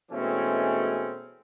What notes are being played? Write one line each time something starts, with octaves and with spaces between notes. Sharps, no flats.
B2 E3 G#3 A3 C4 C#4